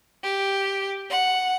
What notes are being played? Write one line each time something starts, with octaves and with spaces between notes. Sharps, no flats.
G4
F#5